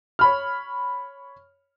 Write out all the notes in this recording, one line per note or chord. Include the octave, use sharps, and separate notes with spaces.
C#5 B5 F6